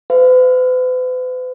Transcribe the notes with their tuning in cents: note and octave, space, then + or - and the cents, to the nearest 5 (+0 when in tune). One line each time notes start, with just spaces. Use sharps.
B4 +45 F5 -30